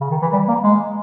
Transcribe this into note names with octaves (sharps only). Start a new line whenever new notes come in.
C#3
D#3
E3
G3
A#3
G#3